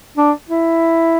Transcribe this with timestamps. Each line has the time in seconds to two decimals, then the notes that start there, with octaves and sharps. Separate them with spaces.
0.17 D4
0.49 E4